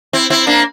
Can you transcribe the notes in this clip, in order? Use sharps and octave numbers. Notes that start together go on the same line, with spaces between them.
C4 E4
C4 E4
A#3 D4